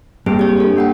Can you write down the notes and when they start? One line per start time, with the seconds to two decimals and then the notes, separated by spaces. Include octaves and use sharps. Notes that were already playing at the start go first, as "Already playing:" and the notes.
0.26 G2 A#3 C4 G#4
0.39 G4 C#5
0.57 D4 A4
0.77 A#3 F#5 G5